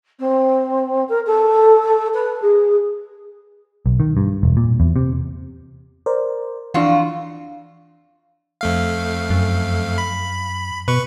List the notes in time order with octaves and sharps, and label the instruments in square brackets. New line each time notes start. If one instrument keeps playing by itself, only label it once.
[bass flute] C4
A#4
A4
B4
G#4
[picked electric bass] B1
D#3
G2
E1
A#2
E2
C3
[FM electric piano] A#4 C5 D5
[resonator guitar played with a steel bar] F2 F4 F#4 [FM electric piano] E3 D4
[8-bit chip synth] F2 A3 F5
[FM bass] F#2
[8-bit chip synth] B5
[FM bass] B2 [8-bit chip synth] B4 C#6